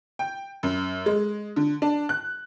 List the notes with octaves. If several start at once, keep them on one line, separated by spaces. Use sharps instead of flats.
G5
F#2
G#3
D3
D4
F#6